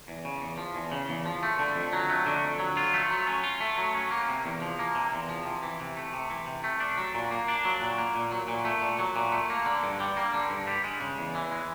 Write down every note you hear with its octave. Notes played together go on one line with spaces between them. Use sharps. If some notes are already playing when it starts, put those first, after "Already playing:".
E2
C#3
E2
F3
E2
C#3
E2
F3
A3
D3
F2
F#3
A3
D3
F2
F#3
F4
A3
F#3
C#4
F4
A3
F#3
C#4
A#3
C3
E2
F3
A#3
C3
E2
F3
C3
E3
C3
A3
C3
E3
C3
A3
D4
F#3
A#2
A#3
D4
F#3
A#2
A#3
A#2
F#3
A#2
A3
A#2
F#3
A#2
A3
A#3
D3
G2
G3
A#3
D3
G2
G3
G#3
C#3
E2
E3
G#3